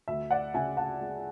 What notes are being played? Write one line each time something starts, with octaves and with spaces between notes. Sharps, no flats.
D2 E5
D5 F#5
C#3 E5 G#5
F#5 A5
G#3